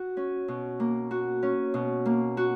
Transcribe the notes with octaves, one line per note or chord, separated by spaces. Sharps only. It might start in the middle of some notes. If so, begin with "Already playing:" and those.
Already playing: F#4
C#4
B2
A#3
F#4
C#4
B2
A#3
F#4